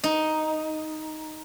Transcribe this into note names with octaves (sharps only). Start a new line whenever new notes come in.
D#4